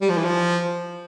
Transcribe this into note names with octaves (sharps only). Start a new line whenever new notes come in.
G3
F3
E3
F3